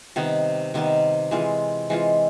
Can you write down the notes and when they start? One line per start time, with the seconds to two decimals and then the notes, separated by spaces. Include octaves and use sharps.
0.16 C3 D#3 G3 B3
0.74 C3 D#3 G3 B3
1.31 E3 G#3 C4 F4
1.90 E3 G#3 C4 F4